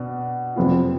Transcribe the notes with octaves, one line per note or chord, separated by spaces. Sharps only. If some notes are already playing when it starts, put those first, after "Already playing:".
Already playing: B2 D4
F2 C3 F3 B3 F4